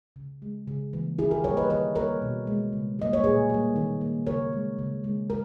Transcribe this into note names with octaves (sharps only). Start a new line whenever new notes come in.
C#3
G#3
C#3
E3 G3 A#3
D#3 E4 G#4
G4 A#4
G3 A#3 A#4 C#5
B4 D#5
D#3 B4 D#5
G3 A#3 A#4 C#5
B2
G#3
C#3
G3 A#3 D#5
C#5
A#2 G#4 B4
G3 A#3
D#3
A#3
C#3 A#4 C#5
G#3
C#3
G#3
A#4